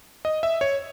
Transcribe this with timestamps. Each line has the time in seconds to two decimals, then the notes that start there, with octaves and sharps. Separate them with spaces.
0.25 D#5
0.43 E5
0.61 C#5